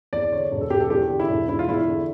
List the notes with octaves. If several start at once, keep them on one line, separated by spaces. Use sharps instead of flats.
E2 D5
D3 C#5
E1
A4
E1 G4
A4
E2 G4
D3
E4
E1
E1 E4
F4
E2 E4
D3